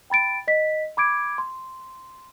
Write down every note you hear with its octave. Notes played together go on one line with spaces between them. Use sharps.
G5 B5 A6 D7
D#5 B6
B5 D6 G#6 D7
C6